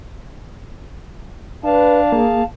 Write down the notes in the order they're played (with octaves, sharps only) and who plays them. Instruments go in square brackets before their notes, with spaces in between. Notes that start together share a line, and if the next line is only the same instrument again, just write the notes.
[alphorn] D4 [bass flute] B4 [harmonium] F5 A5
[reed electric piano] A#3 [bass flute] G#4